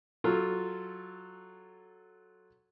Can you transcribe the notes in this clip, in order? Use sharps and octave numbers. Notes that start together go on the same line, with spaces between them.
F#3 F4 A4